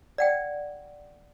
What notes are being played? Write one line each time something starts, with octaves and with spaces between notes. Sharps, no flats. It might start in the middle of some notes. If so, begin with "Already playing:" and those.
D5 F#5 G5